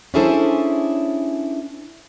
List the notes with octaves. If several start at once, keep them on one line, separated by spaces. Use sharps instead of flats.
C#4 D4 E4 G#4 A4 C5